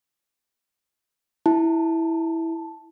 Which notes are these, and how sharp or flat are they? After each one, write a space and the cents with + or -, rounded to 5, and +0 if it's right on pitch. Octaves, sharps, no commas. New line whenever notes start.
E4 -10 A5 +0